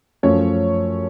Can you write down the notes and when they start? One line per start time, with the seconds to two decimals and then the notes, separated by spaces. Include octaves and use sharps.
0.23 F#2 F3 A3 C#4 C#5